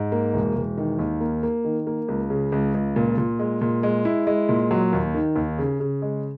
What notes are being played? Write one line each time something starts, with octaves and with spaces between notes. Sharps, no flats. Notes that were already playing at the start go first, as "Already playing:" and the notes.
Already playing: G#2
A#3
E1
E1
D#3
D#2
A#3
A#3
D#3
A#3
C#2
C#3
C#2
C#2
A#2
A#2
G#3
A#2
G#3
E4
G#3
A#2
F#3
D#2
D#3
D#2
C#3
C#3
G#3